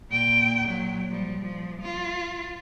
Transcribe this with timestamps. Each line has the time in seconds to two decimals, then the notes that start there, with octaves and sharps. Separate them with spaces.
0.10 A#2 G5
0.68 A#2 F#3
1.10 F3 G3
1.39 F3
1.81 F4